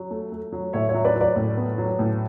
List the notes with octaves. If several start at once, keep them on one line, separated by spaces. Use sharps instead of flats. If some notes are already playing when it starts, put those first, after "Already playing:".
Already playing: F#3
A3
A3
F#3
A2 C#5 E5
C#5 E5
F#3
B4 D5
F#3
B4 D5
A2
B3
F#3
A2